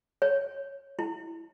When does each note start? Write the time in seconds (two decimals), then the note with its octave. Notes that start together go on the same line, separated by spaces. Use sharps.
0.22 C#5
0.99 E4